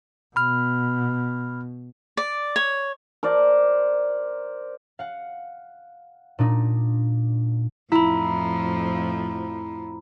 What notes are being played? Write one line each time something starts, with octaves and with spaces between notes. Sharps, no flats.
B2 B5 F6
D5
C#5
A#4 C5 D5
F5 F#5
A#2 D4 D#4
F2 A2 F3 E4 A#5 B5